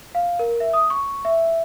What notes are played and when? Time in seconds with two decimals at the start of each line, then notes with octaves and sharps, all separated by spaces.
0.15 F5
0.39 A#4
0.60 E5
0.73 D#6
0.90 C#6
1.25 E5